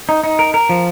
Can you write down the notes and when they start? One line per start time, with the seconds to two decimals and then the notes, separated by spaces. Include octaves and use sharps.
0.09 D#4
0.24 D#4
0.39 A#4
0.54 A#4
0.69 F3